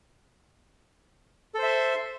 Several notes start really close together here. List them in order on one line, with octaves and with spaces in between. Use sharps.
A4 C5 E5 C6